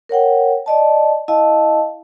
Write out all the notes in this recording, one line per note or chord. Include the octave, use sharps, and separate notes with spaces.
A#4 C#5 F#5 G5
D5 D#5 A5
E4 D#5 F5 A5